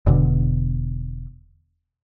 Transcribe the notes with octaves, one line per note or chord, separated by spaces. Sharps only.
E1 B2 D3